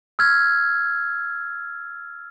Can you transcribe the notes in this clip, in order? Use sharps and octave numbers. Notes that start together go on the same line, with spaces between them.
E6 F6 G#6